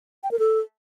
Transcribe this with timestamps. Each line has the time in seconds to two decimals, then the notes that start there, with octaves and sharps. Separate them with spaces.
0.23 G5
0.31 A#4
0.39 A4